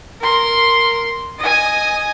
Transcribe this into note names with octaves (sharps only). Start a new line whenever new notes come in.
A#4 C6
D#5 G#5